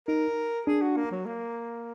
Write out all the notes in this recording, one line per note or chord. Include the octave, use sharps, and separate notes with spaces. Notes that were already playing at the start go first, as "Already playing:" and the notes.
D#4 A#4
D4 G#4
F#4
A#3
F#3
A#3